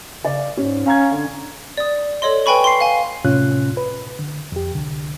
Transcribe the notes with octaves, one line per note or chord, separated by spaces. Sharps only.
C#3 D5
G#2 C#4
C#4 F5 A#5 G#6
D3
D5 D#6
A4 C#5 D#5 C6
B4 G5 G#5 B5 C#6
C6 C7
F5 G#5
A2 C3 C#4 F4 F#6
B4
D3
F2 G4
C2 D3